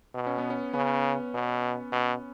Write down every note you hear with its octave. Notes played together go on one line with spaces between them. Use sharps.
B2
C#4
B3
C#4
C#3 B3
B2
B2